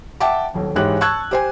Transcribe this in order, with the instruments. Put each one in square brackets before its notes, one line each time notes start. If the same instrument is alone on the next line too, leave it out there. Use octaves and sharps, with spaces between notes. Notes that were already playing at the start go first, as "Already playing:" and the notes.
[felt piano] E5 F#5 G5 A5 D6
D#1 B1
G#2 E3 G#3 G4 C#5 F#6
A5 C#6 E6 F#6 G#6
G4 C5 G#5